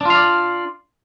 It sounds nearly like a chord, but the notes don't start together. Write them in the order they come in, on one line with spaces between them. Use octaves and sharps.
D4 F4 F5 D5